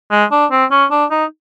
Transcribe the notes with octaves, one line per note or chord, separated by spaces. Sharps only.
G#3
D4
C4
C#4
D4
D#4